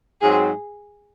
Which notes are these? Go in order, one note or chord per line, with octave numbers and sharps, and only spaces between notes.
G#2 F#3 C4 G#4